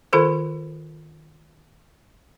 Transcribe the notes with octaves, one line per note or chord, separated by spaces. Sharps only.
D#3 F4 A4 C5